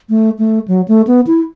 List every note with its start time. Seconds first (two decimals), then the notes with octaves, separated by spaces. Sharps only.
0.09 A3
0.39 A3
0.68 F#3
0.88 A3
1.07 B3
1.27 E4